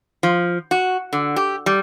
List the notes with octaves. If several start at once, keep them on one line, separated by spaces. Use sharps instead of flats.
F3
F#4
D3
G4
G3